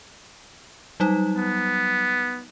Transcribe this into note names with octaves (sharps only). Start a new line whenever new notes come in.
F#3 G3 D#4
B3